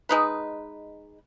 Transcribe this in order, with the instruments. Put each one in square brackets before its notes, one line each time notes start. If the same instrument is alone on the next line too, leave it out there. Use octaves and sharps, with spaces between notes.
[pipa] G#3 D#4 B4